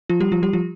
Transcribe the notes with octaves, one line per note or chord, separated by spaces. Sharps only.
F3 F4
G3 G4
F3 F4
G3 G4
F3 F4